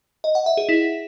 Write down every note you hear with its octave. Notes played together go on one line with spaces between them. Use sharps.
D#5
F#5
E5
G#4
E4